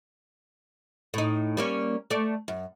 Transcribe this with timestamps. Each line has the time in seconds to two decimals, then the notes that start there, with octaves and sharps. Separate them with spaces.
1.14 A2 D#4
1.57 G3 A#3 C#4
2.10 A3 D5
2.48 F#2